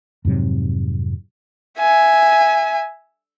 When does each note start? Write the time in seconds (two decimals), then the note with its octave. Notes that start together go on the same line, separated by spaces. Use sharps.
0.25 F2 G#2 C3 F#3
1.79 E5 G#5